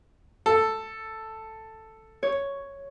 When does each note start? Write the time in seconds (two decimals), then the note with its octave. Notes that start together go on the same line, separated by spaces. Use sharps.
0.46 A4
2.23 C#5